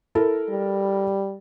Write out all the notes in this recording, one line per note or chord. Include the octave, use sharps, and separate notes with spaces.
E4 A4 A#4
G3